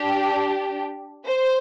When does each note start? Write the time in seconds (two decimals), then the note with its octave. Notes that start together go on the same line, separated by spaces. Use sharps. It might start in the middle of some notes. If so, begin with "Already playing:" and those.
Already playing: D4 G4
1.26 C5